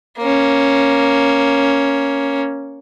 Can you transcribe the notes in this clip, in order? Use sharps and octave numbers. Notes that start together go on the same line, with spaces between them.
A#3 C#4